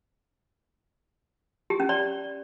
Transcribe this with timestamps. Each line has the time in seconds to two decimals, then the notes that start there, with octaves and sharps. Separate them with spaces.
1.70 G4
1.80 C#4
1.89 D5